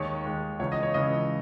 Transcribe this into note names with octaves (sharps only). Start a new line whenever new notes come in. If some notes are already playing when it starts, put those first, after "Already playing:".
Already playing: D#2 D#3 G#3 C#5
D#2 D#3 G#3
C#2 C#3 E3 C#5
D#5
C#5
C#2 C#3 E3 D#5